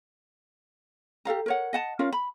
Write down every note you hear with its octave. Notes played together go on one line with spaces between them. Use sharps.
G4 A4 F5 A#5
A#4 C#5 F#5
D#5 F#5 A5
C#4 F4 A#4 F5
B5